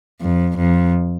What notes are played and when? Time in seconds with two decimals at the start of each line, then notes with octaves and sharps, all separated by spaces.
0.21 F2
0.57 F2